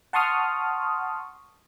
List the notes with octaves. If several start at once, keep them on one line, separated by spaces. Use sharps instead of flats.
F#5 A5 C6 C#6 D#6 F6